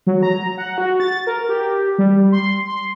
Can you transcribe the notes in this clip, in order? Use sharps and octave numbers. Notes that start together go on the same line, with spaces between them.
F#3
A#5
F#5
F#4
A6
A#4
G4
G3
C6
C6